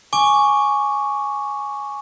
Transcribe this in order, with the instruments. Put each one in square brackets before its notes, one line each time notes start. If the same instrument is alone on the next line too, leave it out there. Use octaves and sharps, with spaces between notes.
[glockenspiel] G#5 C#6 D6